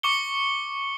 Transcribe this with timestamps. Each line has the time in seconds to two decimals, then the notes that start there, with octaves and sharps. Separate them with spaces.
0.03 C#6 D6 C#7 G7